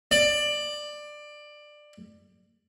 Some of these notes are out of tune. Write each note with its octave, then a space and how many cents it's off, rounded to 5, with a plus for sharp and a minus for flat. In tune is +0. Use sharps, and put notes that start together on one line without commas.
D5 +20